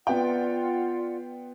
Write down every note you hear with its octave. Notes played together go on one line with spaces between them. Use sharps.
B3 F4 D5 F#5 G5